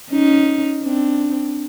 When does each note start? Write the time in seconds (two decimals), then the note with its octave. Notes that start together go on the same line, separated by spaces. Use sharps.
0.10 C#4 D#4
0.84 C4 D4